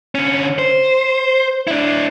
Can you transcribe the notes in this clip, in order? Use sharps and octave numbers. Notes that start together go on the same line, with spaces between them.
D3 C#4
C5
D4 E4